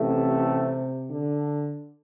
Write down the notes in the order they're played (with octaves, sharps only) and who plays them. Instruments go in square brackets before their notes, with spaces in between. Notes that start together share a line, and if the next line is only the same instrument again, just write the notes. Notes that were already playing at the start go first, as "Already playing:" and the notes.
Already playing: [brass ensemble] A1 A2 A3 [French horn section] C3
[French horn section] D3